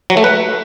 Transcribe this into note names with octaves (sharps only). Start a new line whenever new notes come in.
F#3
A3
B4